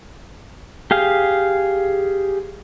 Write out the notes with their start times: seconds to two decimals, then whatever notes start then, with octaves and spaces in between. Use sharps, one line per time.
0.91 G4 G#4 F5